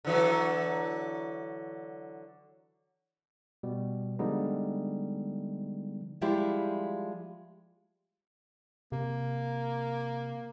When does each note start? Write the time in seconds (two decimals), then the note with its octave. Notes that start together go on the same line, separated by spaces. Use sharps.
0.05 D3 E3 F#3
3.63 B2 G3
4.19 D3 F3 G3 G#3 B3 D#4
6.21 F3 G3 G#3 E4 G4
8.92 C3 A#3